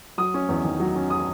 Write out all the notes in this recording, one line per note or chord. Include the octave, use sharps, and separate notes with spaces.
F#3 D#6
C#4
E2
D#3
F#3
C#4
D#6